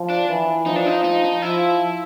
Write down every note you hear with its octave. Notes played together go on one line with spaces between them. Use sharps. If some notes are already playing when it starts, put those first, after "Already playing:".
Already playing: F3
D4
E3
F3 D#4
D4
D#4
D#4
D#4
F3 E4